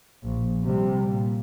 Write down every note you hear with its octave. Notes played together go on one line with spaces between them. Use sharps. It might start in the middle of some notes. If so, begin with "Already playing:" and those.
A#1
C3 G3
A#2